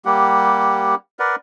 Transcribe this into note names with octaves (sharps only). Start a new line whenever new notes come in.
G3 A#3 G4 F#5
A#4 B4 D5 F#5